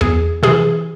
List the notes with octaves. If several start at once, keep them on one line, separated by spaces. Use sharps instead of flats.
E2 G#4
C3 E3 G#4